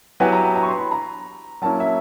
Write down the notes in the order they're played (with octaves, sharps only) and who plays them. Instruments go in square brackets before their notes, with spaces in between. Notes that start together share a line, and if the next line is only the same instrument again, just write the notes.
[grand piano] F#3 B3 E4 G4 B4 [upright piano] G#5
[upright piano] A#5
A#5
A#5
C#6
C6
B5
A#5
[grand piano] F#3 A#3 C#4 E4 [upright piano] A5
[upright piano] E5